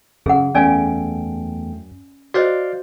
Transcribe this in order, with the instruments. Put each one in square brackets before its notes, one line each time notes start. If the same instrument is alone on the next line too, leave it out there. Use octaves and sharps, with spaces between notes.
[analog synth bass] F#2 [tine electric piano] C#3 [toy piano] G#4 F#5
[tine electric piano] E2 A3 G5 [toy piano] C#4 D5 G#5
[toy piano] F#4 C5 D#5 [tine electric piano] D5 F5 G6